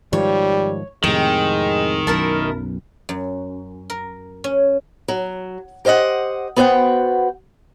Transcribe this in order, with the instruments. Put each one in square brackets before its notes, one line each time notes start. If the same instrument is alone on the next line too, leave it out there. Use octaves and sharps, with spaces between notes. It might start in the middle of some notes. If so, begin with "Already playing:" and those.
[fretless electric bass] G#2 D#3 F3 [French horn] G3 [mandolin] C#5
[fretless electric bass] F2 A2 C3 [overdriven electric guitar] D#3 [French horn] G#3 [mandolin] G5
[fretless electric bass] B1 F#2 [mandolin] E4 A#4 A5
[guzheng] F#2
A#4
C#4
[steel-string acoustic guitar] F#3
G4 C5 D#5 E5 F#5
B3 F#4 C5 F#5 G5